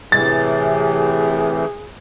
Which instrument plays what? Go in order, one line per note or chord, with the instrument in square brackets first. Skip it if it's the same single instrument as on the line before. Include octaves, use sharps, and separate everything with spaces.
[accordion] A2 C3 E3 [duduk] G#4 [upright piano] A6